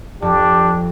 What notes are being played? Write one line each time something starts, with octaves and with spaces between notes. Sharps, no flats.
F2 D4 G4